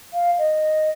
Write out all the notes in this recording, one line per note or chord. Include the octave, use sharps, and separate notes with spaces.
F5
D#5